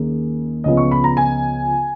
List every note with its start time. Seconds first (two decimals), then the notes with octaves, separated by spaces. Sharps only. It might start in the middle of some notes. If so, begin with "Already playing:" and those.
Already playing: D#2 D#3 A#3 C#4 G#4
0.64 C#2 C#3 F3 B3 D#5
0.77 C#6
0.91 B5
1.04 A#5
1.17 G#5